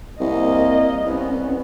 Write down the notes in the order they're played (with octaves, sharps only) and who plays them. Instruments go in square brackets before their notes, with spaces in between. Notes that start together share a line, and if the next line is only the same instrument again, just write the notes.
[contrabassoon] C2 [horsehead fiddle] A#3 D#5
[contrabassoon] C2 [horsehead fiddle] B3 C#4